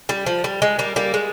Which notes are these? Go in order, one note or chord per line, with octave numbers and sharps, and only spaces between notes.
G3
F3
G3
G#3
G3 A#3
G3 A#3
G#3